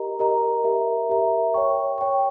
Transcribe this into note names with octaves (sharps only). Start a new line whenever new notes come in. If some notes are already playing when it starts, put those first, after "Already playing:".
Already playing: G4 A#4 D#5 A#5
G4 A#4 D#5 A#5
G4 A#4 E5 A#5
G4 A#4 E5 A#5
C#5 G5 C#6
C#5 G5 C#6